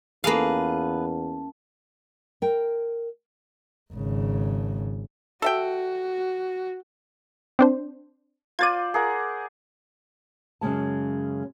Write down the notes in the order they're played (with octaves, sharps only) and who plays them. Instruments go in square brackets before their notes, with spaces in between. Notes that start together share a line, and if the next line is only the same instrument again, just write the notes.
[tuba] E2 [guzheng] A#3 F5 [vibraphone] C#4 A5 [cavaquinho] F4 G#4 B4
[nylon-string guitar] A#4 G5
[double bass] G#1 C#3
[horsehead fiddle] F#4 [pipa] A4 E5 G5
[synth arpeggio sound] C4 D4 C5
[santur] F4 C5 D5 [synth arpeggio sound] G#6 A6 D#7
[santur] G#4 A#4 F#5
[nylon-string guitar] F#2 C#3 G#3 A5